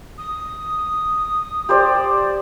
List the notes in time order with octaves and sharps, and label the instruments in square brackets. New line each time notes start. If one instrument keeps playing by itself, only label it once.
[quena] D#6
[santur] G4 C5 D5